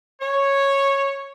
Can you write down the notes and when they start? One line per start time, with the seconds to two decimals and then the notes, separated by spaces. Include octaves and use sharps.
0.22 C#5